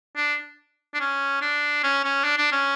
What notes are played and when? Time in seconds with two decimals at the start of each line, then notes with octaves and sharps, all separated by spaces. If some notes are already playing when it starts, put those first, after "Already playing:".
0.16 D4
0.94 D4
1.00 C#4
1.41 D4
1.83 C#4
2.04 C#4
2.24 D4
2.38 D4
2.52 C#4